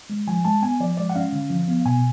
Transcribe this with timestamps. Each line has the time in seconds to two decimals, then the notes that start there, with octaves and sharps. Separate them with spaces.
0.10 G#3
0.27 F3 G#5
0.45 G#3 A5
0.62 B3 G#5
0.80 F3 D5
0.97 G#3 D5
1.10 F#5
1.15 C#4 F5
1.32 D3
1.50 F3
1.68 B3
1.85 B2 G#5